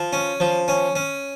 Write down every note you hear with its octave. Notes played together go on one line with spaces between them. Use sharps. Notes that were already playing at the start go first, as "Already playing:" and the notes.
Already playing: F3
C#4
F3
C#4
C#4